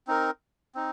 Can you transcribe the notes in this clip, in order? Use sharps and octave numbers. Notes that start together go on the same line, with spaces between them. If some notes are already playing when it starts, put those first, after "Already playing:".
C4 D#4 A#4
C4 D#4